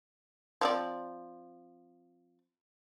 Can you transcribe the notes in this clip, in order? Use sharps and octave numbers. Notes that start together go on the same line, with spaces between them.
F3 C4 D5